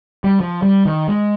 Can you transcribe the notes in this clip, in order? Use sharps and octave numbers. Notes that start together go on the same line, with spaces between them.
G3
F3
G3
D#3
G#3